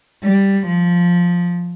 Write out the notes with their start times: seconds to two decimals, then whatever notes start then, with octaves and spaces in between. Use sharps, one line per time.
0.24 G3
0.67 F3